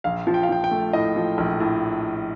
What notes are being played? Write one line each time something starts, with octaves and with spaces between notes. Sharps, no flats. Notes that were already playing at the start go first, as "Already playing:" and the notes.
A#1 F5
F3
G5
F5
F3 G5
G5
A3
A2 D#5
F3
A#1
A2